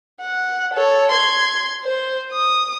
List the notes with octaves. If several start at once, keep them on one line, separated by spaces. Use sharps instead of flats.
F#5
A4 C#5
C6 G#6
C5
D#6